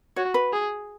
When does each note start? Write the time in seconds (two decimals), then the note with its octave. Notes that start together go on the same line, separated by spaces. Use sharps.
0.16 F#4 C#5
0.34 B4
0.53 G#4